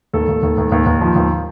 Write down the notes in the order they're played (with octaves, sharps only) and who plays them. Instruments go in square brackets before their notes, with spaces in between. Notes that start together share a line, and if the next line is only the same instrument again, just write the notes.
[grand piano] D#2 A4
D#2
D#2
D#2
D#2
D#2
F3
D#2